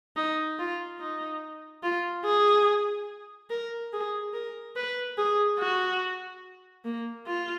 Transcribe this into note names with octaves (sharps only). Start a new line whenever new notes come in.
D#4
F4
D#4
F4
G#4
A#4
G#4
A#4
B4
G#4
F#4
A#3
F4